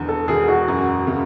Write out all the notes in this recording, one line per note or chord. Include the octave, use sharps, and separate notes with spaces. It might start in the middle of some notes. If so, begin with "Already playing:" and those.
Already playing: E1 E2 D3
A4
E1 G#4
F#4
F#2
C#3